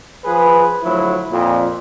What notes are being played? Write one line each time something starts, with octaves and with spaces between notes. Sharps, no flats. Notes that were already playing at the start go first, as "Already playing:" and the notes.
F3 G#4 B4
D2 F3 F#3 E4
F2 A#2